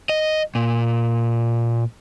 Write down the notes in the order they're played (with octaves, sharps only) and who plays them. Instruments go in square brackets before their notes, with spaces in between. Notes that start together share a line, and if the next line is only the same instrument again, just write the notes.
[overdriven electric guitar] D#5
A#2